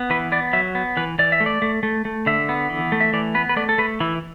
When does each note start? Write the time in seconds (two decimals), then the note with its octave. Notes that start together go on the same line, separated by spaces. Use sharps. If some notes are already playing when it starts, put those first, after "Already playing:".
Already playing: B3
0.10 E3 B4
0.32 B3 D5
0.53 F#3 E5
0.75 B3
0.97 E3 B4
1.19 E3 D5
1.32 E5
1.40 A3
1.46 D5
1.62 A3
1.83 A3
2.05 A3
2.26 D3 E5
2.49 B3
2.70 E3
2.92 A3
3.00 E5
3.13 E3 D5
3.34 B3 B4
3.49 B4
3.56 A3 D5
3.69 A4
3.78 A3 B4
4.00 E3 E4